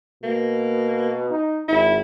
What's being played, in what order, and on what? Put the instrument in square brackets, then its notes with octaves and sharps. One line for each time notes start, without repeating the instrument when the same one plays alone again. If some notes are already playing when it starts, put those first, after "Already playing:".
[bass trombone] B2 [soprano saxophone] A#3
[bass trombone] D#4
[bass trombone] G#1 [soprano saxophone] E4